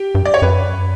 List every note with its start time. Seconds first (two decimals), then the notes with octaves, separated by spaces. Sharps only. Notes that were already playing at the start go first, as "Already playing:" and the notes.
Already playing: G4
0.15 G2
0.25 D5
0.34 C#5
0.42 F#2 B4